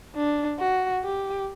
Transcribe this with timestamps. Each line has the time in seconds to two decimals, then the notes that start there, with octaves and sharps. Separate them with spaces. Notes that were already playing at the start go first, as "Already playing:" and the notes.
0.15 D4
0.59 F#4
1.04 G4